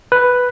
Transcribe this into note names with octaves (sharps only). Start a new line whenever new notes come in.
B4